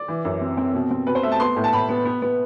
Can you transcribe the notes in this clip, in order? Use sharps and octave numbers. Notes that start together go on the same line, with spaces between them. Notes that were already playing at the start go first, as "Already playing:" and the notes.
Already playing: D5
E3
F#2
C4
C4
B2
C4
B2 B4
C5
A3 E5
A5
B3 C6
A2
A5
A2 B5
B3
B3
B3